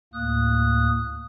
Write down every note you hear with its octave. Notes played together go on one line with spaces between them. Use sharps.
D2 A2 A#3 D#6 F#6